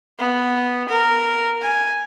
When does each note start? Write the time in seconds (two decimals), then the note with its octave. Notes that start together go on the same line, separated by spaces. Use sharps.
0.19 B3
0.89 A#4
1.61 G#5